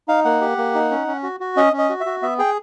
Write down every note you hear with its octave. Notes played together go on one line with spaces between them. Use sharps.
D#4 F5
A#3 F#5
G4
A#3
D#4
C#4
C#4
F#4
F#4
C#4 D#5
C#4
D#5
F#4
E5
F#4
B3 E5
G#4 G5